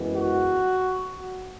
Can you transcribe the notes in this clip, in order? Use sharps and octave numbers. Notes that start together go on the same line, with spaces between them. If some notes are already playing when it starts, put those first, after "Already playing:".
Already playing: F#2 E3 G#3 B3
F#4